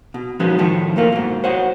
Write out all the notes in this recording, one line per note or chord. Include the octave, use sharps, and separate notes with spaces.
B2
F3 G#3 B3 C#4 D#4 F#4
A2 D#3 F3 A3
A#2 A3 A#3 F4
G#2 B2
F#4 C5 C#5 D#5 F#5